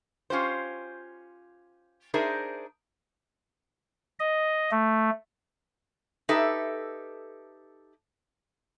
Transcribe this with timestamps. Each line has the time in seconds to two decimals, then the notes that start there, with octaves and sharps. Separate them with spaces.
0.30 C#4 F4 G4 C5
2.14 D4 D#4 G#4 A#4 C5 E5
4.20 D#5
4.71 A3
6.29 D#4 G4 A4 B4 E5